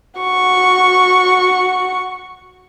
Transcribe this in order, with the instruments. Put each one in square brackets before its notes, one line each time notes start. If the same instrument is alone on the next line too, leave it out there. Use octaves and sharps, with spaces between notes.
[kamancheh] F#4 C#6